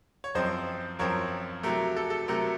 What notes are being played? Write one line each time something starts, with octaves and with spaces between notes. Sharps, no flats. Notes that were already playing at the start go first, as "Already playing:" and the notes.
C#5
F#2 F3 C4 C5 D#5
F#2 F3 C4 A#4 C#5
C3 F#3 A3 A#4
A4
A4
C3 F#3 A3 A#4